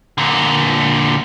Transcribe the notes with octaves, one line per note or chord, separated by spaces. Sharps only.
A#2 D3